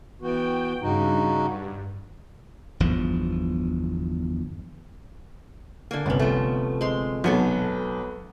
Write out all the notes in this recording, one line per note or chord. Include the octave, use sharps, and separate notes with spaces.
E3 B3 F#4 G5
G2 C#3 D#4 F#4
G1 E2 F3
D3 A#3 G#5
G1 C2 B3 C#4
F3 A3
G#3 C4 C6
B1 F#3 B3 A4 G#5